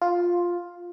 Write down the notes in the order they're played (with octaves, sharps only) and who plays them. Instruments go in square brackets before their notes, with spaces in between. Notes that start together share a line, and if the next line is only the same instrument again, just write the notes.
[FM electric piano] F4